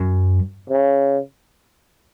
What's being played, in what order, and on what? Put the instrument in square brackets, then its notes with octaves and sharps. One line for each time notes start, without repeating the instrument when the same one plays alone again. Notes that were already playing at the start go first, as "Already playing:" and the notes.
Already playing: [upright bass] F#2
[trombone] C#3